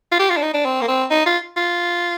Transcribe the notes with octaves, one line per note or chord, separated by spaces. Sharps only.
F4
G4
F4
D4
D#4
D4
C4
A#3
C4
D#4
F4
F4